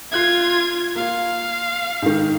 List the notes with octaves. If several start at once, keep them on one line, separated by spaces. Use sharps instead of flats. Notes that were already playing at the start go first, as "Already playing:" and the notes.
F4 E5 F#6 G#6 C7
A#3 F4 F5
G#2 D#3